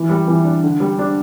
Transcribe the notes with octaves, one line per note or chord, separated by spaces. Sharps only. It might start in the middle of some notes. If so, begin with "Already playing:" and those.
Already playing: E3
G3
E3
D4
D3
G3
D4